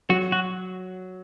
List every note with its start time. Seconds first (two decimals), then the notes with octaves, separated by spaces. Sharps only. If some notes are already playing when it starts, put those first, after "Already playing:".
0.09 F#3 F#4
0.32 F#4